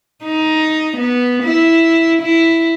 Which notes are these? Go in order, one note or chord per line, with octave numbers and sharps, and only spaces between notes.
D#4
B3
E4
E4